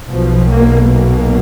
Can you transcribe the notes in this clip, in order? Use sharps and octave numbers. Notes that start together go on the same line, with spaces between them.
B1 B2 F3
A#3
A#3